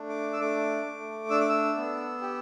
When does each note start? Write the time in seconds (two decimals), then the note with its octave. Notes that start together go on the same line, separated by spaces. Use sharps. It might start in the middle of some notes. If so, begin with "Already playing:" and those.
Already playing: A3 D4
0.09 D6
0.33 E6
0.40 A3 D6
0.86 A3
1.30 D4 E6
1.40 D6
1.49 E6
1.77 B3
2.21 G4